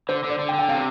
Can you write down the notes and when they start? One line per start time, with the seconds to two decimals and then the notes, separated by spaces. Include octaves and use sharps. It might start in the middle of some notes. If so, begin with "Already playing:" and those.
0.09 D3 C5
0.24 D3
0.29 D5
0.39 D3
0.49 G5
0.54 D3
0.59 G5
0.69 C3 F5